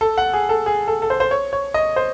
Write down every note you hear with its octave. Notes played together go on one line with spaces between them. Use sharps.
A4
F#5
G#4
A4
G#4
A4
A4
C5
C5
C#5
C#5
D#5
C5